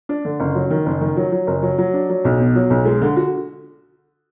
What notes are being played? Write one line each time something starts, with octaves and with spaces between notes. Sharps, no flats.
D4
D3
F#1
F#3
D#3
F#1
D#3
F#3
F#3
F#1
F#3
F#3
D4
F#3
B1
B2
F#3
B1
G#3
D3
F#4